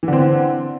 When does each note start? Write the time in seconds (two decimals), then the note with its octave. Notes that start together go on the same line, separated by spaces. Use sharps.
0.03 E3
0.08 D3
0.13 C4